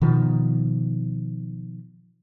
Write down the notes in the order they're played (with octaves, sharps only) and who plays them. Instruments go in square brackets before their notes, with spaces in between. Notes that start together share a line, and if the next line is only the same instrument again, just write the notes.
[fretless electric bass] B2 D#3 F3